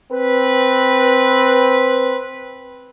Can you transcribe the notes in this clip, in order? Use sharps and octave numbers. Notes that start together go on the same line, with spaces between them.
C4 B4